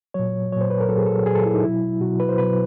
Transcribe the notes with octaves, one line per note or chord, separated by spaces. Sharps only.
A#2 F#3 C#5
A#2 F#3 C5 C#5
B4
A#4
A#2 F#3 A4
G#4
A4
A#2 F#3 G#4
A4
E4
D#4
B2 F#3 E4
B2 F#3 F#4
B4
C5
B2 F#3 B4